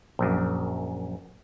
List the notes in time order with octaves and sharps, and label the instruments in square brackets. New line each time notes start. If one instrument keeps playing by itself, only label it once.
[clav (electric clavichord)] A#1 F#2